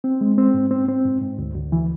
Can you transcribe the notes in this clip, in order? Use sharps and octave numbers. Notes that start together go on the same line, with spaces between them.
C4
G#3
C4
G#2
C4
C4
G#2
G#2
D2
D2
E3